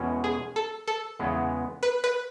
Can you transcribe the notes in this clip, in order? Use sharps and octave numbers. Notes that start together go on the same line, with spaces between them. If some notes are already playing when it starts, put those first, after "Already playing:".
Already playing: E2 B2 G#3 C#4
G#4
A4
A4
E2 C#3 G#3 B3
B4
B4